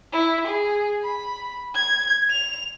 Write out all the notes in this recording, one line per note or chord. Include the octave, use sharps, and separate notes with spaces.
E4
G#4
B5
G#6
F7